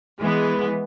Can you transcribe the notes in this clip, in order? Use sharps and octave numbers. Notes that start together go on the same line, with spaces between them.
E3 G#3 B3